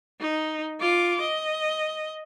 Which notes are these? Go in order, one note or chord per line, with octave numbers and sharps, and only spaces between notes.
D#4
F4 D6
D#5